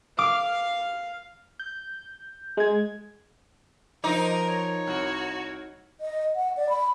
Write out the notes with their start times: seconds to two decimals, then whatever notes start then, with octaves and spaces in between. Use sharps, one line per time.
0.19 F5 D6
1.59 G6
2.57 G#3 G#6
4.04 F3 D#4 A#4 C5 D#5 D6
4.48 C#5
4.87 C2 F#4
6.01 D#5
6.35 F#5
6.57 D5
6.69 B5